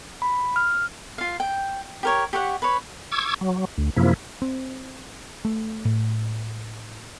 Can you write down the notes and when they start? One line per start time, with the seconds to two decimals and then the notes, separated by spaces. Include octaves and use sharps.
0.22 B5
0.56 F6
1.18 F4 F5
1.40 G5
2.03 G4 A#4 C#5
2.33 G4 C#5 E5 F#5
2.62 B4 C#5
3.11 C#6 D6 E6 G#6
3.41 F#3
3.78 D2
3.97 F#2 C3 F3 A#3 E4
4.42 C4
5.45 A3
5.85 A2